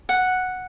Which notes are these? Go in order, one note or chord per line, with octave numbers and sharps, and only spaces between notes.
F#5